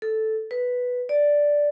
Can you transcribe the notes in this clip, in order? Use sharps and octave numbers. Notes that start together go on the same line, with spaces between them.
A4
B4
D5